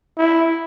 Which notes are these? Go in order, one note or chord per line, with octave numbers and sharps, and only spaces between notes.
E4